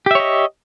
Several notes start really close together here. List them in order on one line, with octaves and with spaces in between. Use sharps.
G4 E5 C#5 D#5